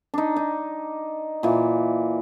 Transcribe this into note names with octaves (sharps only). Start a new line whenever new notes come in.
D4 D#4
D#4
A#2 E3